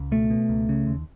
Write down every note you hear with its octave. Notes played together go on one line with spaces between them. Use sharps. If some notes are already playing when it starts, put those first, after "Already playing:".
Already playing: C#2
B2 A3
B2
C#2
C#3
D#2